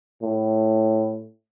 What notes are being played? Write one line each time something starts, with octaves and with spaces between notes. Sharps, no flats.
A2